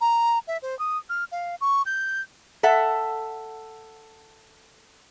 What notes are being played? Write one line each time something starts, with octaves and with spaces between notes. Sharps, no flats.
A#5
E5
C5
D#6
F6
F5
C#6
G6
A4 E5 F#5